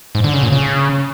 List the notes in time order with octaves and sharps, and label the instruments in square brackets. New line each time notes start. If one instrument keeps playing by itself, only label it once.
[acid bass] G#2
D3
C#3
A#2
C#3